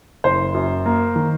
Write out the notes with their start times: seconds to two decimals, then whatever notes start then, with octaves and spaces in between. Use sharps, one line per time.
0.24 F#1 C5
0.54 F#2
0.86 A#3
1.15 D#3